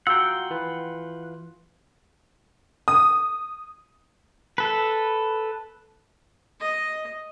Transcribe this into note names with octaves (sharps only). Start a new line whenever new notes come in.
F4 F#4 F#5 G5 A#5 E6
E3 F4 B4
D#6
A4 B4
D#5